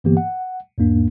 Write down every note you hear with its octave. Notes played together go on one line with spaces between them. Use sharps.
G2 D3 E3 A#3 B3 G4
F#5
E2 G#2 A#3 D4